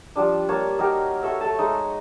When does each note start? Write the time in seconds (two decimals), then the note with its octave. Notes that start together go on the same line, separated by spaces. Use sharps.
0.16 F3 G3 D4
0.49 G3 A#3 C#5 A5
0.79 D#4 F#4 G4 A#4
1.23 F#4 A4 C#5 E5
1.41 A3 A4 A5
1.59 G#3 D#4